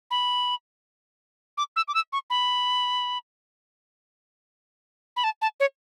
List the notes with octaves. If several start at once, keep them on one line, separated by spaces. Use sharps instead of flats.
B5
D6
E6
D6
E6
C#6
B5
B5
A5
A5
C#5